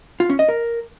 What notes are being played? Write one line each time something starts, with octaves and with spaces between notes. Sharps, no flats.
F4
C#4
D#5
A#4